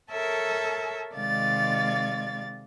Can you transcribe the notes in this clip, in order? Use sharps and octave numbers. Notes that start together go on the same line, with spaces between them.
A4 A#4 C#5 E5 A5
C3 D#3 G#3 D5 F5 A6